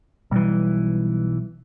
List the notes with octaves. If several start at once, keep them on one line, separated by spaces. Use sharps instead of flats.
B1 E3 G3